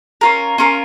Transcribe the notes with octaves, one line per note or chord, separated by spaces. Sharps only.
C#4 F4 A#4
C#4 F4 A#4